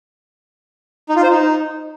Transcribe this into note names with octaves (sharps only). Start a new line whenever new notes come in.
D#4
F4
C5
D#4